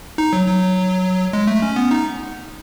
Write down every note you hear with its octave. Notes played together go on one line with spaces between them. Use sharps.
D#4
F#3
F#3
G#3
A3
C#4
B3
D#4